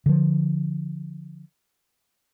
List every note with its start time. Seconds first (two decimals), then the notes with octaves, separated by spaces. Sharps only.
0.06 D3 F3